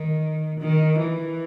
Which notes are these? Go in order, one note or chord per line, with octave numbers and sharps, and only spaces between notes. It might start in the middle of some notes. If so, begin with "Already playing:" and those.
Already playing: D#3
D#3
E3